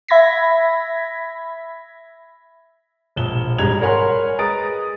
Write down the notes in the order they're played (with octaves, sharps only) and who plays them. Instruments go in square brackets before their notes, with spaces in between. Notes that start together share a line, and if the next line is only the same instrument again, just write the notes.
[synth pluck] E5 B5 G#6 A#6 B6
[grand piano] E1 A#1 E7 G7
G#1 G3 G#3 A#5 G#6 F7
A#4 C#5 F#5 G#5 B5 C6
G#3 B4 A#5 D#6 A6 D7